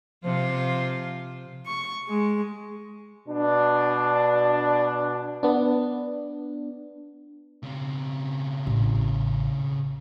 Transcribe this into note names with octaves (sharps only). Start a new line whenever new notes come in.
C3 F3 F4
C#6
G#3
B2 D4
B3 D4
C#3 C4
A1